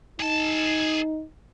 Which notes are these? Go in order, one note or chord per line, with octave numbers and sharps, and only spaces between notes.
D#4 G#4 A5